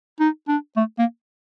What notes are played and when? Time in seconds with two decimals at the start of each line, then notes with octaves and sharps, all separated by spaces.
0.20 D#4
0.48 D4
0.77 A3
0.98 A#3